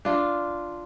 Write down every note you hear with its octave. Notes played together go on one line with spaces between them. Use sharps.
D4 F4